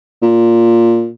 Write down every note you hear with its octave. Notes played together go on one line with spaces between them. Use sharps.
A#2